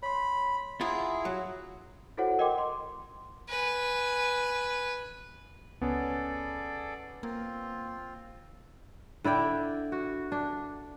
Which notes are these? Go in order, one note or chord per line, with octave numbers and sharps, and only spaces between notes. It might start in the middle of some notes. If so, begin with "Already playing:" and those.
C#5 B5 C6
E4 F4 G#4 F#5 A#5 C6
F#3
E4 F#4 A4 C5 C#5 F#5
A#4 D#5 F#5 G5 C6 D6
C6
B4 G#5
C#2 B3 C#4 G#4 A4 D5
A#3 C4 F4
D3 E4 D5 G5
F#4
D4